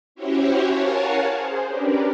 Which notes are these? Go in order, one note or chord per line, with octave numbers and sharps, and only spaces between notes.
C#4 E4 F#4 G4 C5 C#5
A#4 C#5 F5 F#5 G#5 A5
G#4 C5
C#4 D4 G4 A#4 B4 D5